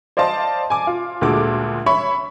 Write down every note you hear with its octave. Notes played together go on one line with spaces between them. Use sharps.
C5 D5 D#5 F5 A5 C6
G#5 D6
F4
D2 A#2 G#3 F#4 A4 D6
C#5 E5 B5 C#6